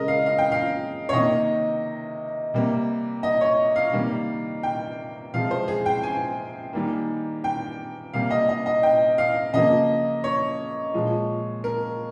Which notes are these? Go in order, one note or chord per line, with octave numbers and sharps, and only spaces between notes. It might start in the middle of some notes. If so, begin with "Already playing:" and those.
Already playing: C#3 G#3 A#4 D#5
F5
F5
G5
F5
C#5
C3 D#3 A#3 D#5
C3 G3 A#3
D#5
C#5
F5
C3 D#3 G3 A#3
G5
C3 F3 G#3 F5
C5
G#4
G5
G#5
D#3 G3 A#3
G5
C3 G3 A#3 F5
D#5
D#5
D#5
G5
F5
C#3 F3 A#3 D#5
C#5
A#2 F3 G#3
A#4